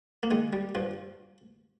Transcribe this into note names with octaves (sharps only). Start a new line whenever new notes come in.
A#3
D#3 G#3
G3
G2 F3